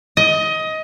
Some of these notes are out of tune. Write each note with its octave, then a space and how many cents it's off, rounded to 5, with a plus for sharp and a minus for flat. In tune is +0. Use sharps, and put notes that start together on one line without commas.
D#5 +20